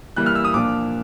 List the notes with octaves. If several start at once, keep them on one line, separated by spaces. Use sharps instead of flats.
E3 G3 A#3 F#6
F6
E6
D#6
A#2 F3 A#3 D4 D6